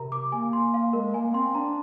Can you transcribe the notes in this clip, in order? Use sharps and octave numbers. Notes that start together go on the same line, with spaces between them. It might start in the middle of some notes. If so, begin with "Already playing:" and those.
Already playing: C3 A#4 A#5
D6
A#3 G#5
C6
F5
G#3 A#4
A#3 G#5
C4 C6
D4 A#5